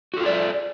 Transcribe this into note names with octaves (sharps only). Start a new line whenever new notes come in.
F4 F#4 G#4 A4 D5